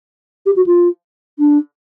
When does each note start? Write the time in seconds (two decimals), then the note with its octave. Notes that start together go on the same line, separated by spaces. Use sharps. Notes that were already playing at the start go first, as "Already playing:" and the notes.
0.46 G4
0.56 F#4
0.66 F4
1.39 D4